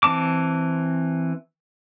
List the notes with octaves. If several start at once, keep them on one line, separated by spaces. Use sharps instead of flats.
E3 C4 A5 D6